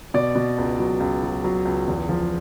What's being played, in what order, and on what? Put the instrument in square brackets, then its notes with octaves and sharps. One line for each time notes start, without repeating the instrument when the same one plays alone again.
[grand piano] B2 D5
B2
C#2
F#3
C#2
F#3
F#3
C#2
E2
F3